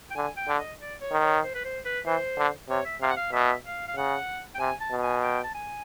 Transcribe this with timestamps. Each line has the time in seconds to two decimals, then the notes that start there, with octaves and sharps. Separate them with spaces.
0.11 G5
0.16 D3 G#5
0.37 G5
0.48 D3
0.59 D#5
0.80 D5
1.01 C#5
1.11 D#3
1.22 C#5
1.43 C5
1.54 B4
1.65 C5
1.85 B4
2.06 E3 C5
2.38 D3
2.69 C3 C#5
2.85 E5
3.01 C3 F5
3.10 F#5
3.17 F5
3.33 B2 E5
3.65 F5
3.88 F5
3.96 C#3 F#5
4.55 G5
4.59 C3 G#5
4.80 A5
4.91 B2
5.02 G#5
5.23 G5
5.44 A5
5.55 G#5